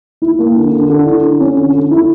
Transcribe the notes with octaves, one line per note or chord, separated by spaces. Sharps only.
E4
A#3
D3
D3
D3
E4
D3
C#4
D3
D3
E4